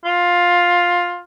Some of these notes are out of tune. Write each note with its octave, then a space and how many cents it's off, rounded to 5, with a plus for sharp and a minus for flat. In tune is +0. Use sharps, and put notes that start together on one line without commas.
F4 +10